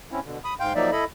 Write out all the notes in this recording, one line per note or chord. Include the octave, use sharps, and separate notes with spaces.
C4 C#4 E4
B2 D3
B5 D#6
G#2 F5 G5 C6 G6
F3 F#3 A#3 D#4 D5 E5
E4 A4 D#5 B5